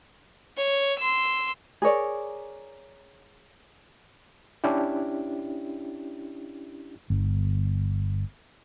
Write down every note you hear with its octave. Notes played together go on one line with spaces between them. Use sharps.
C#5
C6 E6
G#4 A#4 C#5 D5
C#4 D4 E4 G4
G1